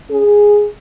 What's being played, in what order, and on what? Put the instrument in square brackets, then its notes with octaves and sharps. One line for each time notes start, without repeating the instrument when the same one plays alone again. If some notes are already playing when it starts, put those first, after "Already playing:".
[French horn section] C#4 G#4